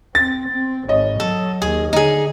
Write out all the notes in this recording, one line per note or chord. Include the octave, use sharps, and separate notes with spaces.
C4 A6
C4
G#1 C#5 D#5
F#3 A4
D#2 G#4
D3 D#4 G#4